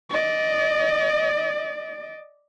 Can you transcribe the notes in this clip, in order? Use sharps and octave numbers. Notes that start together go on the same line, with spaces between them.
D5 D#5